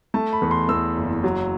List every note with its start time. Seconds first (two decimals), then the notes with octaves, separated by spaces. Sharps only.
0.14 A3 A5
0.33 B5
0.42 E2
0.51 C6
0.69 E2 E6
0.96 F#1
1.24 F#3